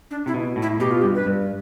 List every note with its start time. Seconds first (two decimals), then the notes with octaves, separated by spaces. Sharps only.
0.11 D4
0.26 C3 E4
0.34 B2
0.56 A2
0.62 E4
0.80 B2 G4
0.91 F4
1.02 G2 G4
1.15 B4
1.26 G2